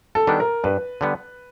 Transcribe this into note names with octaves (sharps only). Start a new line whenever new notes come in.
A4
D#3 G3 B3 D4
A#4
G2 B4
D3 G3 B3